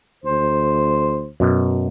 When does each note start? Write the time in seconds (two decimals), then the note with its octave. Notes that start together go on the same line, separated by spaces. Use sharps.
0.24 D2 C5
1.40 F#2 B2